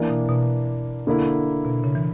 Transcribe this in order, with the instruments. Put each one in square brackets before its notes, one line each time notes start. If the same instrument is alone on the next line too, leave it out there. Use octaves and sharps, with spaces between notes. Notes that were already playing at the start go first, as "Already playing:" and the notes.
Already playing: [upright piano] E3 A#3 D4
[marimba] B2
B2
[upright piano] D3 A#3 E4
[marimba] B2
C#3
E3